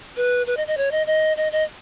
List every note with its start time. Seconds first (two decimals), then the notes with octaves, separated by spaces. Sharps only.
0.17 B4
0.47 B4
0.57 D#5
0.67 D#5
0.77 C#5
0.92 D#5
1.07 D#5
1.37 D#5
1.52 D#5